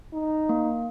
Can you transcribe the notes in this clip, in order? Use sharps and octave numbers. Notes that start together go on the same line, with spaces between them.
D#4
A#3